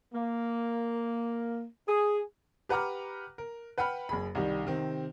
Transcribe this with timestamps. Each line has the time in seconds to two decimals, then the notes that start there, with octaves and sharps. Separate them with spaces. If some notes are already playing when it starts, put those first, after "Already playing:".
0.13 A#3
1.87 G#4
2.69 G4 B4 F#5 A#5 D6 F6
3.38 A#4
3.78 B4 F#5 G5 B5 F6
4.09 F#1 G#4 B5
4.35 C2 D#3 G3
4.65 C3 D#3 C4